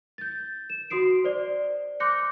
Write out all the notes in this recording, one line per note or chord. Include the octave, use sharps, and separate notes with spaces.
G6 A6
E7
F#4 C6 D#6 C7 D7
C5 D5
C6 D6 F#6 G6 A#6 C#7